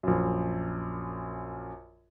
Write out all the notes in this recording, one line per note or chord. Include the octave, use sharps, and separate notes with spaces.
A#1 F#2